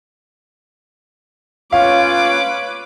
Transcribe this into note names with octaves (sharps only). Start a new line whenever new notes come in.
C#4 F4 B4 C#5 F5 D6